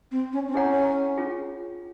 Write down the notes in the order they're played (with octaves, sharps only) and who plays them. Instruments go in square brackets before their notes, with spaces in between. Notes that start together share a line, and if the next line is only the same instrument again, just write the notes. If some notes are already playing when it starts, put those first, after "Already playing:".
[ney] C4
C#4
C4
[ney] C#4 [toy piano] E4 G#4 C#5 F#5 A#5
[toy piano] C#4 F4 G#4